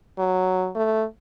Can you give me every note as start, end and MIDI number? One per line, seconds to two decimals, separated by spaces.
0.18 0.70 54
0.75 1.04 57